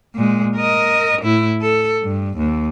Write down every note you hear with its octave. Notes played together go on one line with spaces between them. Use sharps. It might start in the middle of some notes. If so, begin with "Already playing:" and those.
A#2 G#3
A#4 D#5
A2 E4
A4
G2
D#2